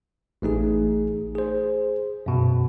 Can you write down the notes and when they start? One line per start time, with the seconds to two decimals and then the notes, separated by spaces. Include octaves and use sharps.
0.42 A1 A3 D#4 G#4
1.35 G#4 C5
2.26 F#2 B2